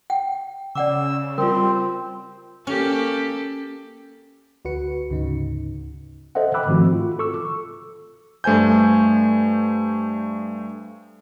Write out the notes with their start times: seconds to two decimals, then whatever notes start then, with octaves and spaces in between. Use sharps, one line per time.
0.10 F#5 G5
0.75 C#3 D5 F#5 D6 E6
1.38 G3 C4 F4 A#4
2.67 A#3 C#4 G4 A4
4.65 D2 F#4 B4 C#7
5.10 D2 G#2 C#3 D#4
6.35 A4 C5 D#5 E5 F#5
6.54 G5 B5 D6 E6 F#6
6.67 G#2 D#3 F3 A3 C4 F#4
6.93 F4
7.19 A4 C#6 D6 E6
8.44 G2 A3 C5 G#5 G6